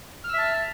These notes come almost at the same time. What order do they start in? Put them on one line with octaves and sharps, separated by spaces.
F6 E6 E5 A5